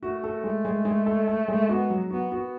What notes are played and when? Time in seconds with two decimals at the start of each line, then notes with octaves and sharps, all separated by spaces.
0.02 A3 F#4
0.24 A4
0.44 G#3 A3
0.65 G#3
0.85 G#3
1.06 A4
1.28 A4
1.48 G#3
1.69 B3 F#4
1.90 F#3
2.10 B3 F#4
2.31 B3 F#4